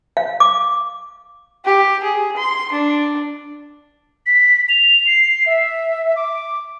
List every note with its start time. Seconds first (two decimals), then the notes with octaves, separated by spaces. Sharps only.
0.17 F5
0.40 D6
1.65 G4
2.03 G#4
2.36 C6
2.72 D4
4.26 B6
4.69 F7
5.07 C7
5.46 E5
6.16 D6